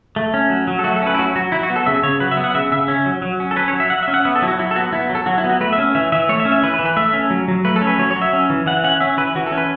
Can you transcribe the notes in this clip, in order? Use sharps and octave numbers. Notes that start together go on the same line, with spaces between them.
A3
C#4
F#3
F#3
A4
A3 F#4
A4
C#4 B4
E4
F#3 F#4
F#3 F#4
F#3 E4
F#4
B3
A4
C#3 E5
C#3 C#5
F#3 B4
E5
B3
F#5
C#3 E5
C#3 E5
C#4
F#3
F#3
C#4
A4
C#4 B4
C#5
F#3
E5
F#3 F#5
E5
C#4
F#5
B3 E5
A4
F#3 E4
F#4
F#3 E4
A4
B3 F#4
B3 E4
F#3
A4
F#3 F#4
E4
B3
F#4
A3 B4
E5
C#4
E3 E5
E3 E5
A3 C#5
E5
C#4
E5
E3 B4
B4
E3
B4
A3 E5
C#4
F#3
F#3
A3 B4
A4
C#4
B4
F#3 C#5
C#5
F#3
E5
C#4
E3
E3 F#5
C#4 F#5
C#4 E5
E3 B4
E3 F#4
A4
C#4
B4